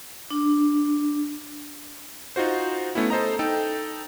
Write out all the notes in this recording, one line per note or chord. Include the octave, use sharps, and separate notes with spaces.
D4
D#4 F4 F#4 C5
A3 B3 C#4 E4
A4 C5 D#5 A#5
D#4 A4 G5